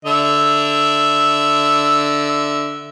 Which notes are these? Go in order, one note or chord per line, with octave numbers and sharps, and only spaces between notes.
D3 E5